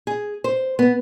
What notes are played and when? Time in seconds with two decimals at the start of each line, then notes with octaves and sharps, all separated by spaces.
0.07 G#4
0.44 C5
0.79 B3